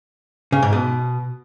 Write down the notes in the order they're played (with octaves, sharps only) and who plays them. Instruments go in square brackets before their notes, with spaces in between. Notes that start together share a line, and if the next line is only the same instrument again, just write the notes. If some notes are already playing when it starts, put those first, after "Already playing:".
[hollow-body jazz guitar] C#3
G#2
B2